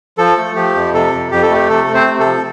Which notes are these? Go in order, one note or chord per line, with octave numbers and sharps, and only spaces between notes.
F3 A4
A3
F3 G4
F2
C3 A4
F2
F2 G4
A4
A3 G4
C3 A4
A3
C4 C5
C3
A4
F3